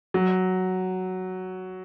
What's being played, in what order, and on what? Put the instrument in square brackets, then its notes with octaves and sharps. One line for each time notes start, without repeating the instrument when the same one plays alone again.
[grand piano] F#3